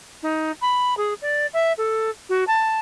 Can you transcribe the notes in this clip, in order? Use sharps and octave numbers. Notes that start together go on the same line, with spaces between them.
D#4
B5
G#4
D5
E5
A4
F#4
A5